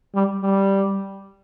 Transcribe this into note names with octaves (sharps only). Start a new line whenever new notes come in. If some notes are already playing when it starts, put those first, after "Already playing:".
G3
G3